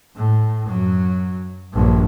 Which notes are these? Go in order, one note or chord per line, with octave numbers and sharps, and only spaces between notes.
A2
F#2 F#3
A#1 G2